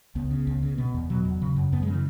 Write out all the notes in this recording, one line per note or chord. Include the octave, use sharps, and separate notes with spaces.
C#2 B3
C#3
C#2
C#3
B2 B3
E2
B2 F#3
E2
C#3
F#2
F#2 B3
G#3
C#3
E3